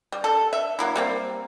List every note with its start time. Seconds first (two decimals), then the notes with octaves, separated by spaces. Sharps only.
0.12 G3
0.24 A4
0.53 E5
0.79 F#3 A#3 E4
0.96 G3 A#3 C4